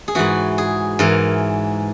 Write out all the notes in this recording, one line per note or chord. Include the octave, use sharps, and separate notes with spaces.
G#4
G#2 E3 F#4
G#4
G#2 E3 A#4